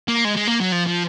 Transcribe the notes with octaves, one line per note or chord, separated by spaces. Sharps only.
A#3
G#3
G#3
A#3
F#3
F3
F3